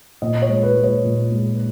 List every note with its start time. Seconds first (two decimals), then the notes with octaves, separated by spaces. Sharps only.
0.22 A#2 D#5
0.42 C#5
0.49 G#3
0.63 B4
0.77 G#3
0.83 C#5
1.04 A#2
1.32 G#3